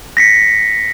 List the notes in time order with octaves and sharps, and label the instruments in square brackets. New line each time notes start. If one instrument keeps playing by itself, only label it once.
[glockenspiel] A#6 B6 C#7